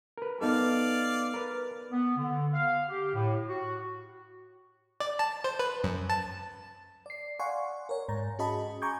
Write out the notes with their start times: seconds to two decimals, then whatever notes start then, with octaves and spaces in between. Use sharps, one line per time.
0.18 A#4 B4
0.41 B3 D#4 A4 D5 F5
1.34 A#4 B4
1.91 B3
2.17 D3
2.52 F5
2.89 G4
3.14 A2
3.48 F#4
5.00 D5
5.19 A5
5.44 C5
5.59 B4
5.84 F#2
6.10 A5
7.06 D5 C7
7.39 D5 F5 F#5 G#5 C6 C#6
7.89 A#4 C#5
8.09 G#2 A#5
8.39 C#4 F#4 G#4 D#5 A5 B5
8.82 G#5 A#5 C#6 D6 G6 G#6